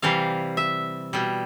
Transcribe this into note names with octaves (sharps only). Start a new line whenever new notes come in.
C3 E3 G3 F5
E5
B2 G3